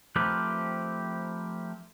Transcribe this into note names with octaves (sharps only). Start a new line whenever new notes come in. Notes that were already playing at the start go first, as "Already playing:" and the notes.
F3 A3 C4 G4 A#4 B4